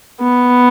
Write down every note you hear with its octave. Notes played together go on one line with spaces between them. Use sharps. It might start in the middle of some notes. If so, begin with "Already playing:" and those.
B3